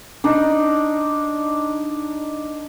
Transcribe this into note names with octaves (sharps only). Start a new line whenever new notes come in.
D4 D#4